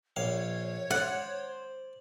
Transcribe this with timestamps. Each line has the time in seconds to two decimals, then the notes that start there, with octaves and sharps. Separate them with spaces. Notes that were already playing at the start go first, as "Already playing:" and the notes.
0.16 A#1 C#5 F5
0.91 C5 D5 F#5